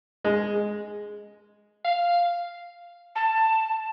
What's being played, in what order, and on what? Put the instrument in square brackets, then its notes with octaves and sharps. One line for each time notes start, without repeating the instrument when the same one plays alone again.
[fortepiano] G#3
[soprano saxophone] F5
[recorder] A5